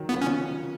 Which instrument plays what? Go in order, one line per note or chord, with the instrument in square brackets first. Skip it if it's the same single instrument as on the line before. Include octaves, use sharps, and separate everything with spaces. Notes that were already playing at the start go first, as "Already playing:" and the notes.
Already playing: [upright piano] D#3 F#3
[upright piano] C#3 F3 [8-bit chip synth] B3
[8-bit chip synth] C#4